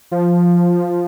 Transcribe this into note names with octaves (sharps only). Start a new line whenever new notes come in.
F3